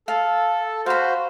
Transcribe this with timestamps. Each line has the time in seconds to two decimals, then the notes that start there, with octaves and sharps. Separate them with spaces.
0.08 A4 F5
0.86 F#4 C5 F5 B5